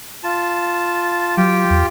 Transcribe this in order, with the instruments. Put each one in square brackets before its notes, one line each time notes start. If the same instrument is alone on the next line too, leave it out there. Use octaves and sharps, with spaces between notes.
[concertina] F4 A5
[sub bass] F#3 [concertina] F4 G4 G5
[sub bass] E2